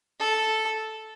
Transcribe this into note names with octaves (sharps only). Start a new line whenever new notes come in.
A4